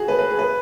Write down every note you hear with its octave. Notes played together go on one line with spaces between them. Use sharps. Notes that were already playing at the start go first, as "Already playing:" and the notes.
Already playing: F#4 G#4
B4
B4
G#4
B4